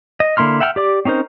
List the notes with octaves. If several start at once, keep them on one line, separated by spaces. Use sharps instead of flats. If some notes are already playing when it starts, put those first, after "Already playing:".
D#5
D3 A#3 E4 C6 F6
E5 F#5 G5 A5 F6
G4 D5 D6
C4 C#4 D#4 A#4 C5